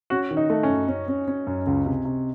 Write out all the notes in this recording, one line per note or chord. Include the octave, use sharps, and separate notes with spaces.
C#4 F#4
D#3
D#4
A3
C#4
F#2
C#4
C#4
C#4
F#2
C#2
C3
C3